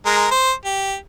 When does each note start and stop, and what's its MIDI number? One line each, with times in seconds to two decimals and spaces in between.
0.06 0.26 56
0.06 0.26 70
0.31 0.52 72
0.65 0.95 67